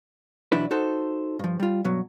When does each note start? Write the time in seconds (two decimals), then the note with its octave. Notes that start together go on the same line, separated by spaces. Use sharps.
0.52 B1 E3 F#3 D4 E4 B4
0.71 D#4 F#4 A4 C5
1.39 G2 F3
1.60 G3 F4
1.84 G2 B2 F#3